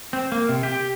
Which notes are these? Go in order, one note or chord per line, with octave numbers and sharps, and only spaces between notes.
C4
A#3
C3
G4